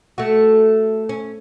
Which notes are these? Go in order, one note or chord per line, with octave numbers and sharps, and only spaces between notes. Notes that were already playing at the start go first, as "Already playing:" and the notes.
A3 F#4
C#4